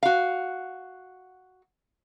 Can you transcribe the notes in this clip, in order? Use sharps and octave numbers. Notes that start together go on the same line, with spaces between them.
F#4 F5